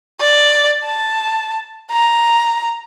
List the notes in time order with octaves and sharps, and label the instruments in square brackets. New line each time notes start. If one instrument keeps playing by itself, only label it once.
[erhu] D5
A5
A#5